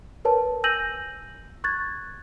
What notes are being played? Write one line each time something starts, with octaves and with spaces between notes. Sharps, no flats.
A#4 B4 C#5 A5
G#5 E6 G6 A#6 D#7 F#7
C#6 F#6 G#6 A6